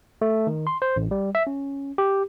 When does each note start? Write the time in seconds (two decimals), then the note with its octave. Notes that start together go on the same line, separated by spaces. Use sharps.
0.21 A3
0.47 D#3
0.67 C6
0.82 C5
0.96 A1
1.11 G3
1.35 E5
1.47 C#4
1.98 G4